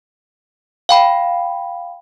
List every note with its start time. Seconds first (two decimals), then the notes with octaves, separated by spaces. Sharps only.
0.89 F5 G5 B5